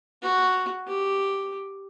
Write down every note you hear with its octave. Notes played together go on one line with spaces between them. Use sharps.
F#4
G4